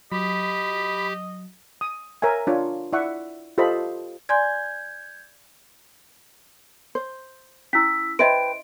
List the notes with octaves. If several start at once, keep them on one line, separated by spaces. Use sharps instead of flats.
F#3 G4 D#5 B5
D#6
A#4 C#5 E5 G#5
D4 F4 C#5
E4 D5 E5 F#5 C#6
F4 G4 A4 C5 D#5 B5
D5 G#5 C6 G6 G#6
C5
C#4 E4 E6 B6
B4 C5 D#5 E5 G5 C6 D7